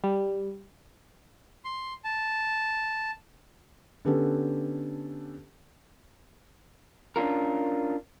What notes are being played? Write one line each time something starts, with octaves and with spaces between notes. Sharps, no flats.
G3
C6
A5
D3 B3 C#4 G4 A4
C#4 D4 F4 A#4